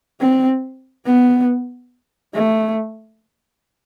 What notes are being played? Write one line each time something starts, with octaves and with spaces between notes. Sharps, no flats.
C4
B3
A3